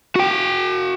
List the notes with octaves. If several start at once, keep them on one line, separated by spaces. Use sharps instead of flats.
F#4 G5